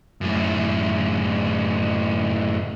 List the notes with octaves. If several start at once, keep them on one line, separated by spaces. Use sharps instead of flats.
F#2 A2